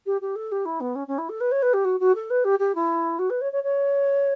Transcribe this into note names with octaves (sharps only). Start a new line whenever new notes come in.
G4
G4
A4
G4
E4
B3
C#4
C#4
E4
A4
B4
C#5
B4
G4
F#4
F#4
A4
B4
G4
G4
E4
F#4
B4
C#5
C#5
C#5